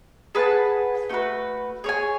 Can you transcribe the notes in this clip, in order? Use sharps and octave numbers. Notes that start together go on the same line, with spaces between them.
G#4 B4 F#5 A5
A3 D#4 F#4 B4
G#4 C#5 G#5